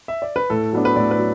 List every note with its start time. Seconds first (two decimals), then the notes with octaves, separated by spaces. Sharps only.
0.08 E5
0.22 D5
0.36 B4
0.50 A2 A4
0.72 F#3 B3 D4
0.85 B4
0.96 A2 D5
1.11 B4
1.19 F#3